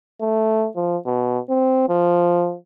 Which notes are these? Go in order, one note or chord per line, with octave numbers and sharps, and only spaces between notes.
A3
F3
B2
C4
F3